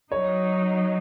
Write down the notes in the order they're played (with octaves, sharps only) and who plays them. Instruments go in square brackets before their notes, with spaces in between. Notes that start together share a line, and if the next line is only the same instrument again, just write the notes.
[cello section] F#3 D#4 [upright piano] C#5